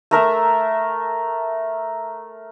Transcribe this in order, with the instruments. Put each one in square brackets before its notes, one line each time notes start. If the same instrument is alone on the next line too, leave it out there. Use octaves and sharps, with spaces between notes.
[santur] A3 A#4 E5 A#5